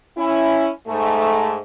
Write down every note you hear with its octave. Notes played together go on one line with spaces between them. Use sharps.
C#4 E4
G#2 A3